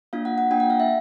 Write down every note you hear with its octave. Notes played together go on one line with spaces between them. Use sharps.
A#3 D4 F4 F5
F#5
F#5
A#3 D4 F4 G5
F#5
F5
E5